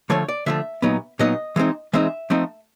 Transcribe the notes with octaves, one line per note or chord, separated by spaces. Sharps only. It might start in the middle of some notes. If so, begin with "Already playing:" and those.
D3 F3 A3 C#5
D5
D3 F3 A3 E5
A#2 F#3 B3 D#4
A#2 F#3 B3 D#4 D#5
E3 G#3 C4 D#4
E3 G#3 C4 D#4 E5
F3 A3 C4 D#4